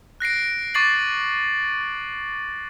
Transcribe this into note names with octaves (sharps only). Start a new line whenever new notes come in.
F#6 A#6 C7 D7
C#6 D6 A6 C7 F#7